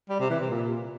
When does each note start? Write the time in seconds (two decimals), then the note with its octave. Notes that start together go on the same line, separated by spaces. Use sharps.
0.09 G3
0.20 C3
0.30 E3
0.40 C3
0.50 A#2